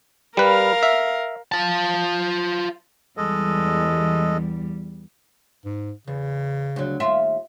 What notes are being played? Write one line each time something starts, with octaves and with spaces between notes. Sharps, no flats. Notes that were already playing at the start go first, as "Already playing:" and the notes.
G3 A#4 B4 F5
E5
F4 A5
E2 G3 G#3 A4 D#5
G#2
E2 C#3
D2 F#3
D#2 F4 E5